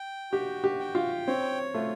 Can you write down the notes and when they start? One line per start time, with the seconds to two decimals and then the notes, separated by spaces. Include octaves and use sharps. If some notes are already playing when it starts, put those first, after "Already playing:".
Already playing: G5
0.32 F#4 G4
0.64 G4
0.79 G5
0.95 F4
1.27 C4 C#5
1.74 A3 F4